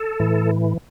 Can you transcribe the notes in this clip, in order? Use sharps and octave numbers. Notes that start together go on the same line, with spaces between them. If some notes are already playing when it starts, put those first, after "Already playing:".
Already playing: A4
A2 E3